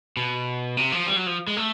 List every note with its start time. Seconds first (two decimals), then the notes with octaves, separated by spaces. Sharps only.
0.17 B2
0.77 C3
0.92 F3
1.07 G3
1.16 F#3
1.26 F3
1.47 G#3
1.57 A3